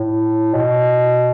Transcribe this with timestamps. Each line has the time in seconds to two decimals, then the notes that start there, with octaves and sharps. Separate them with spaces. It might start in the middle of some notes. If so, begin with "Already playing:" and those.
Already playing: A2
0.54 B2